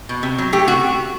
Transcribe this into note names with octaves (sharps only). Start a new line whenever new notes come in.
B2
C3
F#3
A3 G4
C3 F#4